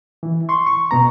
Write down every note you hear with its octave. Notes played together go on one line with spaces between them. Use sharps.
E3
C6 C#6
C#6
B2 B3 A#5